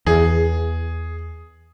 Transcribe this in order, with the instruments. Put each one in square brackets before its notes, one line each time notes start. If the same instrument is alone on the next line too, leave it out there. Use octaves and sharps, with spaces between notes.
[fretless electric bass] E2 [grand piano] G#4